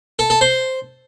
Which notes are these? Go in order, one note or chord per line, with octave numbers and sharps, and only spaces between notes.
A4
A4
C5